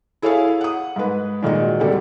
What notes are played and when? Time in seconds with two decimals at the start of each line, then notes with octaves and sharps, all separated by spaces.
0.22 E4 G#4 A4 C#5 E5 F5
0.61 F#5 D#6
0.96 G#2 B4
1.42 A#2 D#3 G#3 F#4
1.80 D2 C3 G3 A3